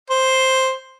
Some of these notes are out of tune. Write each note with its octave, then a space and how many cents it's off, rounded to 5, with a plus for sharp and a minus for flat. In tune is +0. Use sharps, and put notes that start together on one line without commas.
C5 +5